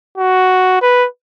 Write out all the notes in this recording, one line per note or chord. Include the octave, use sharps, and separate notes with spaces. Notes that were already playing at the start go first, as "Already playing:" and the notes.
F#4
B4